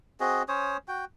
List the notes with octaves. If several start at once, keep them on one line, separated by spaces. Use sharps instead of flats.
C4 F#4 G#4 D#5
C#4 C5 C#5 D#6
F#4 G5